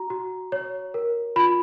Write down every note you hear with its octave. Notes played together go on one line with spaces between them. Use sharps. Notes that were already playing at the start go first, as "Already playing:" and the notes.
Already playing: F#4 A#5
F#4
C#5
A#4
F4 B5